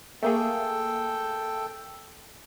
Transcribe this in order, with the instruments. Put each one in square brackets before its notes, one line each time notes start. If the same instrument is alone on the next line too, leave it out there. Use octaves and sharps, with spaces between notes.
[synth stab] A3 A#3 G#4 [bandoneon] A4 G5